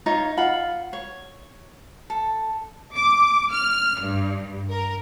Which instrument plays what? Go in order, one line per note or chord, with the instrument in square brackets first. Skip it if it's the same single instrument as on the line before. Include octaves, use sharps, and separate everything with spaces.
[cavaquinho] D#4 F4 C#5
F4 F#5 B5
C#5
A4
[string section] D6
F6
G2
A#4